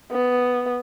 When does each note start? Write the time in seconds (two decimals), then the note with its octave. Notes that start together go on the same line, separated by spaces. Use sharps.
0.12 B3